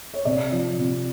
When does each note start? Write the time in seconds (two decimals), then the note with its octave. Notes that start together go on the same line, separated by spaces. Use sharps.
0.14 C#5
0.25 C3 D5
0.52 F3
0.79 C3